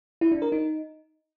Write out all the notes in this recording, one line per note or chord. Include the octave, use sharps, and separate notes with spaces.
E4
D4
A#4
D#4